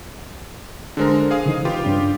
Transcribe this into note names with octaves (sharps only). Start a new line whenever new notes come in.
D3 G#3 D4 A4 A#4 C5
G#4 F5 D#6
C#3 E3 D#4
F4 G4 B4
G2 C#4 D4